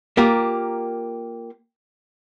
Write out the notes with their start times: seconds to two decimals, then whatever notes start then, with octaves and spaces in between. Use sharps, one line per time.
0.17 A#3 F4 G4 A#4